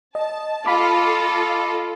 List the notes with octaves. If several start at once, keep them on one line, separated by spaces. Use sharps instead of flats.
D#5 A5
F4 A4 D#5 F5 B5 D6